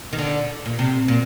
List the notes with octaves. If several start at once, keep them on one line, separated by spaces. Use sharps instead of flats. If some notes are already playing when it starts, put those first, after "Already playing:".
D#3
D3
A#2
C3
A#2